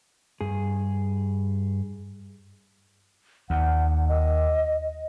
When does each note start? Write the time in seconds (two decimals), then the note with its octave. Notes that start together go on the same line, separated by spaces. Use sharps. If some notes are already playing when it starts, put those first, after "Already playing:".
0.41 G2 G#4
3.50 D#2 F#5
4.08 D#5